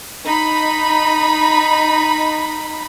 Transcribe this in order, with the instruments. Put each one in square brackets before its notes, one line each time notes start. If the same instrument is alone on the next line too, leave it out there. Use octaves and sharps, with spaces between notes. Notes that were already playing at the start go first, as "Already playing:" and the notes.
[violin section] D#4 B5